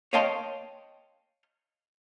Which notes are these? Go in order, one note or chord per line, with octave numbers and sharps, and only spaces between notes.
C#5 D#5 F5 G5 A5 C6